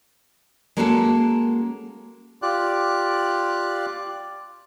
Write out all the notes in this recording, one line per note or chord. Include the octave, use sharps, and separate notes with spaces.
G#3 A#3 C#4 F#4 G#4 A4
F4 G4 D5 F#6